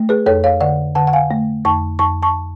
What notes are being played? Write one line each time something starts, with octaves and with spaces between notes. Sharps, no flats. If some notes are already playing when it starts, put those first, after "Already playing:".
Already playing: A3
G#4 B4
F2 A4 C#5
C#5 F5
D3 D5 F#5
D3 F#5 A5
F#5
F5 G#5
A3
F2 A5 C#6
F2 A5 C#6
A5 C#6